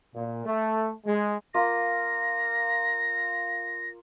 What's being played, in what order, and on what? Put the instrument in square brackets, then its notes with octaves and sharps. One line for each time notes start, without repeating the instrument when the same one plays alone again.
[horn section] A#2
A3
G#3
[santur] A#3 F4 [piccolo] A#6